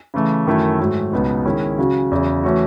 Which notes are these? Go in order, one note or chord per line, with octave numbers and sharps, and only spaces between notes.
C#3 E3 A3
F#2 D#3 A3 E4
G#2 F#3 A3
C#2 B2 F#3 B3 D#4
D#3 G#3 C#4 E4
C#3 F#3 C#4 F#4
E2 C#3 F#3
E3 A3 C#4 F#4